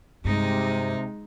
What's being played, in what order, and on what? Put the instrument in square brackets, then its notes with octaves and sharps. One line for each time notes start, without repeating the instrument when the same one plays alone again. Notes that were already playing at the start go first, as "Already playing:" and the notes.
[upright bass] G2 [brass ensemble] C3 [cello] G#3 D#4